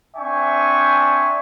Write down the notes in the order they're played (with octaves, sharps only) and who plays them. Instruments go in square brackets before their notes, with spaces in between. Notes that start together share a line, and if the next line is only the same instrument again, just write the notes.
[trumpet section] C4 D4 E5 G5 G#5 C#6